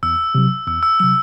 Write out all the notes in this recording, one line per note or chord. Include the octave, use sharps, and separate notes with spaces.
E2 E6
C3 F#3
E2 E6
E6
C3 F#3 E6